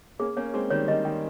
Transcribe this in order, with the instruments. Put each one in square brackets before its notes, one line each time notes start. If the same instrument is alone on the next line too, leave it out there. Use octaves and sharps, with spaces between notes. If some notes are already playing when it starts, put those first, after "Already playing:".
[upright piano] A#3 C#4 [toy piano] G#4
[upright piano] A#3 C#4 [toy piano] C#5
[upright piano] G#3 C4 [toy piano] G#4
[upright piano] D#3 G3 [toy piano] C#5
[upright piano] D#3 G3 [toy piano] D#5
[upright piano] D#3 G3 [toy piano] G5